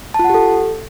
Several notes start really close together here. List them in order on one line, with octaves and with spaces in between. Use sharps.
A5 F4 F#5 G4 A4